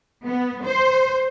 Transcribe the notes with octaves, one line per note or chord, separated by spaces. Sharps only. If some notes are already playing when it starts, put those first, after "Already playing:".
B3
C5